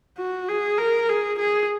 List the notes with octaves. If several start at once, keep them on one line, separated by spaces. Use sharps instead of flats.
F#4
G#4
A#4
G#4
G#4